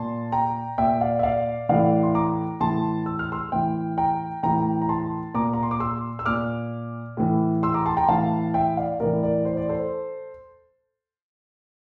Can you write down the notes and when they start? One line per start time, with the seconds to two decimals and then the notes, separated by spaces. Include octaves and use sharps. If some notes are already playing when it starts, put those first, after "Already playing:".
Already playing: A#2 A5 C6
0.32 G5 A#5
0.78 A#2 E5 G5
1.01 D5 F5
1.19 E5
1.23 D5 F5
1.69 A2 E3 D5 F5
2.03 C6
2.15 A#5 D6
2.61 A2 E3 A5 C6
3.06 E6
3.19 F6
3.32 C6 E6
3.52 A2 E3 E5 G5
3.98 G5 A#5
4.43 A2 E3 G5 A#5
4.82 A#5
4.89 A5 C6
5.34 A#2 A#5 D6
5.53 A#5
5.63 C6
5.71 D6
5.80 C6 E6
6.19 E6
6.25 A#2 D6 F6
7.17 A2 E3
7.63 C6 E6
7.74 A#5 D6
7.86 A5 C6
7.97 G5 A#5
8.08 A2 E3 F5 A5
8.54 E5 G5
8.77 D5 F5
9.00 A2 E3 A#4 D5
9.23 A#4 D5
9.45 C5
9.57 D5
9.69 A4 C5